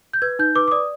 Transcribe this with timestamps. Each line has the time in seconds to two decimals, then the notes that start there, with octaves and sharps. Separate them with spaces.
0.13 G6
0.22 B4 G#6
0.39 D#4 G6
0.55 B4 D6
0.68 D6
0.71 D5 D#6